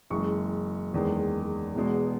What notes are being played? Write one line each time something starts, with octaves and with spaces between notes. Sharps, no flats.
F#1 F#2 E3 G#3 C#6
F#1 E2 D#3 G#3
E1 E2 B2 G#3